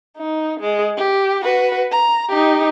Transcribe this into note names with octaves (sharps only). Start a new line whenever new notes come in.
D#4
G#3
G4
F#4 B4
A#5
D#4 G4